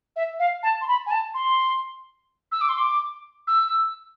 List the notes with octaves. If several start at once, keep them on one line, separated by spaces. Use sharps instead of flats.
E5
F5
A5
C6
B5
G#5
A5
C6
E6
D6
C6
D6
E6